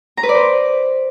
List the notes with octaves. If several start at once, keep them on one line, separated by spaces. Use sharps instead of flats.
A#5
B4
D5
C5